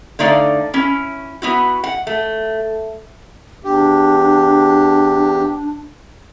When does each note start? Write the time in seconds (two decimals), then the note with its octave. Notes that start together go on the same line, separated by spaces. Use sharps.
0.19 D3 A3 D#4 D5 F5
0.74 C#4 E4
1.42 B3 E4 F#4
1.84 F#5
2.07 A3
3.64 E2 D4 G4